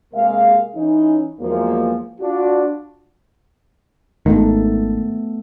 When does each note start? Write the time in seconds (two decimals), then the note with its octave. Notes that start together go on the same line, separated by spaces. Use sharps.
0.13 C3 G#3 A#3 G#4 A#4 F5
0.75 E3 C#4 D#4
1.40 E2 F3 F#3 G#3 A#3
2.20 D4 F4 F#4
4.26 G#1 D#3 A3 B3 A4